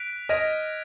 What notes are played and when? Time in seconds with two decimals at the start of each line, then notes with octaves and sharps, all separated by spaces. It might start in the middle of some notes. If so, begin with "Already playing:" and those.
Already playing: F#6 B6 D7 F7
0.29 D#5 F6 G#6 D7 F7